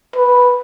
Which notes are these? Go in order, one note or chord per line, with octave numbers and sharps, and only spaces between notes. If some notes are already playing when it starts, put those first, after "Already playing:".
B4